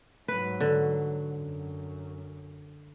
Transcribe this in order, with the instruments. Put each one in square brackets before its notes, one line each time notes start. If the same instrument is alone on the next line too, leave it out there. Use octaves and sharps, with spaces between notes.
[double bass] G#2 F#3 [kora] B4
[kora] D3
[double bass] F#2